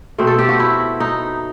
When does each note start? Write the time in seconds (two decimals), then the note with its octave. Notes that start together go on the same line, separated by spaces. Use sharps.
0.18 B2 A3 C4
0.27 A4
0.39 G4
0.49 F#4
0.59 E4
1.00 D#4